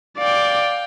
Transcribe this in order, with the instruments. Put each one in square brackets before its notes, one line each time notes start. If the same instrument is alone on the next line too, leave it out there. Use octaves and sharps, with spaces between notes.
[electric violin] D5 [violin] F5 G5